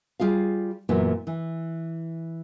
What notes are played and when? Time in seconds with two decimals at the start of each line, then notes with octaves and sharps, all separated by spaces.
0.20 G3 F4 G#4 F5
0.89 F#2 A#2 E3 B3
1.27 E3